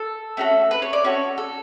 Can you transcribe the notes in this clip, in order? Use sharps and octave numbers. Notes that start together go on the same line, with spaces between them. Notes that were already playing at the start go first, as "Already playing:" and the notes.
Already playing: A4
A3 C#4 F#4 A4
B4
C#5
D5
C#4 F#4 A4 C#5
A4